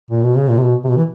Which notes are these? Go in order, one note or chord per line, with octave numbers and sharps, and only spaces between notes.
A#2
B2
C#3
A#2
C3
B2
C3
B2
E3